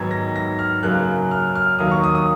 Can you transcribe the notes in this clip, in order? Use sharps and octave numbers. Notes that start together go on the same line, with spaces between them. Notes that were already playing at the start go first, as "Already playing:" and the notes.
Already playing: G#2 D#3 F#3 B3 G#6
A#6
A#6
F6
F#2 C#3 F#3 A#3 F#6
F6
F6
D#2 D#3 F#3 A#3 D#6
C#6
D#6
D#6